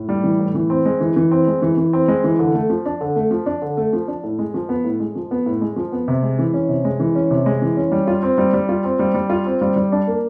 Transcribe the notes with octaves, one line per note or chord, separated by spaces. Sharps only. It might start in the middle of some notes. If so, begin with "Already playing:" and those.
Already playing: A2
G3
E3
A2
E3
C4
G#3
E3
E3
C4
G#3
E3
E3
C4
G#3
E3
D3
A3
F3
D4
D3
A3
F3
D4
D3
A3
F3
D4
A2
G#3
F3
B3
A2
G#3
F3
B3
A2
G#3
F3
B3
C3
G#3
E3
C#4
C3
G#3
E3
C#4
C3
G#3
E3
C#4
G3
F4
C4
G3
G3
F4
C4
G3
G3
F4
C4
G3
G3
D4
A#3